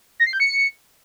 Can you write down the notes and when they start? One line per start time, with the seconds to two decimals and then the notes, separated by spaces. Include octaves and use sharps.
0.20 A#6
0.26 C7
0.33 G6
0.40 C#7